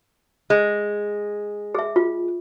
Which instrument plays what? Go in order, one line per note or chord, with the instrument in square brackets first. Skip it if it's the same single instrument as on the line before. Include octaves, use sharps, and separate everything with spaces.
[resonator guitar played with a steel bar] G#3
[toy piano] G#4 E5
F4